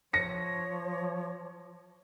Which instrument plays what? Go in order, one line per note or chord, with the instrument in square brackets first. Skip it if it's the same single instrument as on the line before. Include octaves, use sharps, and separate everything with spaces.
[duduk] F3 [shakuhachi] C#5 [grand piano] A#6 C#7